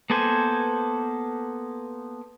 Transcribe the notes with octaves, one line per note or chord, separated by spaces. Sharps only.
A#3 B3 A4 C5 G#5